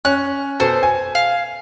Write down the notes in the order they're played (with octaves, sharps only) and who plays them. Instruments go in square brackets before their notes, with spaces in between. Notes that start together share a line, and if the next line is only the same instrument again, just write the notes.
[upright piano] C#4 [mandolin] F#6
[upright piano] B2 A4 [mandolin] C5
[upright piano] G#5
[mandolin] F5